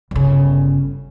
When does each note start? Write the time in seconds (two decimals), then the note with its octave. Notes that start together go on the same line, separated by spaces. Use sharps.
0.11 G1 C#3